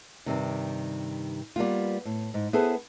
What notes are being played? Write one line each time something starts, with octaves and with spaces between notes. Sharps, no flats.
G2 C3 D#3
G3 A#3 B3 F4
A2
G#2
B3 E4 G#4 A4 B4 C5